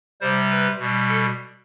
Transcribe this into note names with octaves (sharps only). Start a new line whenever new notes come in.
C3 G3 C5
B4
B2 G3
A4